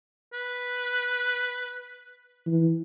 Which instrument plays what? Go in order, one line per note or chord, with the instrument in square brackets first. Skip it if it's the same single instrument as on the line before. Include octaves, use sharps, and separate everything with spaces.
[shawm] B4
[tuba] E3